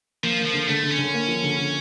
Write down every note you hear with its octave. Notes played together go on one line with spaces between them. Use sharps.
F3 A#3
A#3
F3
D3
D3 A3
D3
C#4
D3
A#3
F3
D3
D3